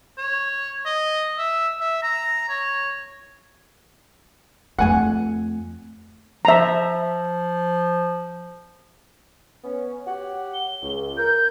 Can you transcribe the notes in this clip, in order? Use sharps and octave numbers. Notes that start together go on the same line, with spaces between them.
C#5
D#5
E5
E5
A#5
C#5
F2 A3 F#5 G#5
F3 E5 A#5
B3 C#4
G4 C#5 F#5
G7
C#2
A#4 G6